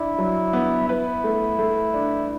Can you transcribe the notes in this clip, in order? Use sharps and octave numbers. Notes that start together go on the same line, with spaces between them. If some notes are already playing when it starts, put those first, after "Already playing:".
Already playing: D4 E4
F#3
B3
E4 B4
A3
A3
D4